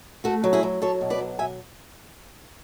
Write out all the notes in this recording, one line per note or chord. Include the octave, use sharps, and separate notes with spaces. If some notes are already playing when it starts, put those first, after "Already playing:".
A3 F#4 A4
F#3
E4 G#4
F#3
F#3 A4 C#5
B2
B4 D5
F#3
B2 E5 G#5